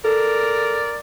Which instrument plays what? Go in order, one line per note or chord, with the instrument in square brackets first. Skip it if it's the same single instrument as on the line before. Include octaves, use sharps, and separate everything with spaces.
[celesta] A4 [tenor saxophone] A#4 [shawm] D5